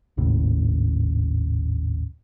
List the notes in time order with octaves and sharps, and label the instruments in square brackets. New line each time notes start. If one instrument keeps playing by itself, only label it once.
[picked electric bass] G#1 D#2 A2 C#3